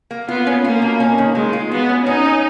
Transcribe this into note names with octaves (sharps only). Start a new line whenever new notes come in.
A#3
B3 F4
C#4
A#3 F4
B2
C#4
D#3
D#3 G#3
F4
B3 F#4
C#4
C#4 D#4
C#4